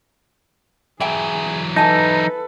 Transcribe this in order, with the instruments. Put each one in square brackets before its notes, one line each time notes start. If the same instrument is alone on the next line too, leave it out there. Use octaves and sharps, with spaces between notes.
[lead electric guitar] E3 F#3 [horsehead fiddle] G#4 [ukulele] E5 G5 G#5
[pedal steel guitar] D#4 [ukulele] E4 G#5 A5 [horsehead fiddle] A4 B4